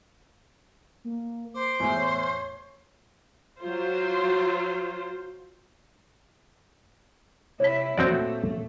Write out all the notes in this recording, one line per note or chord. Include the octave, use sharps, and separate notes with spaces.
A#3
C5 D6
E2 A2
C#5
F#3 F4 C5
C3 E4 C#5 B6
A#2 A3 C4 F#4 D5